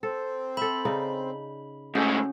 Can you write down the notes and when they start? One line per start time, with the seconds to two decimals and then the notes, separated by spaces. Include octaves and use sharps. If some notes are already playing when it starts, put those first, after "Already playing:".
0.03 C4 A4
0.57 A4 E5 B5
0.85 C#3 D#4 D5
1.95 G#2 A3 C#4 F#4 A4